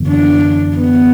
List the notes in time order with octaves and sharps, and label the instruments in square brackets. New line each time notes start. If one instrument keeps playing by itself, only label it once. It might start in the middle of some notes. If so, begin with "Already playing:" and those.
Already playing: [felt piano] F#1 E2 D3
[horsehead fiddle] D4
B3